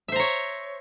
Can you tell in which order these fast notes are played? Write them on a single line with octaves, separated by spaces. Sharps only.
E5 C5 A#5 C#5